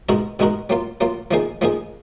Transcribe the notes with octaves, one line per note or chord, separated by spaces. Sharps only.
B2 G#3 D#4 F#4 A#4
B2 G#3 D#4 F#4 A#4
F#3 A#3 F4
F#3 A#3 F4
F3 A#3 D#4 G#4
F3 A#3 D#4 G#4